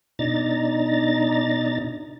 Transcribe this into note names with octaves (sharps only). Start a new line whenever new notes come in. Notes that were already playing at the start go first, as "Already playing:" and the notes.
B2 D4 D#4 A#5 A6